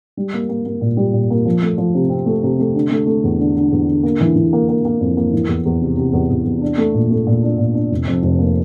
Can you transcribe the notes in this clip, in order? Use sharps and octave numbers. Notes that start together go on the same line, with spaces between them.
G3
A#3
A#3
A#3
A#2
G3
A#2
A#3
F3
A3
F3
C3
C4
A3
C3
A3
D3
A3
A3
E2
D3
D3
E2
D3
A#3
E3
E3
A#3
A#3
A#3
F2
A#3
E3
E2
E2
C3
C3
E2
E2
E2
D4
A3
A#2
A3
A#2
D4
A#2
D4
F1
F2
F1
A#3